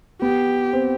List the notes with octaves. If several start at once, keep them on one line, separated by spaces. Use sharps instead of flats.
B3 G4
C4